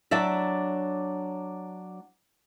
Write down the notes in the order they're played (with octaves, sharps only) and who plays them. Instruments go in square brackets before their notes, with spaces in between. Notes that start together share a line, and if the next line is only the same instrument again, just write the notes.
[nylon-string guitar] F#3 D4 D5 E5